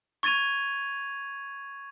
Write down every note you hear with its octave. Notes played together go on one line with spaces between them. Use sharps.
C#6 G#6 A6 D#7 F7